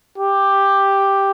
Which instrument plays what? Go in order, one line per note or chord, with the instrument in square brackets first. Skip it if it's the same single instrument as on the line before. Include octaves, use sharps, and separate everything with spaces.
[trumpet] G4